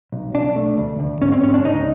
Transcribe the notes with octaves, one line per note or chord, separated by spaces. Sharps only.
B1
B1 D4
A3
D2
D2
G#2 C#4
C4
G#2 C#4
D4
C#2 D#4